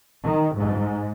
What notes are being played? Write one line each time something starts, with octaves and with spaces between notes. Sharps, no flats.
D#3
G#2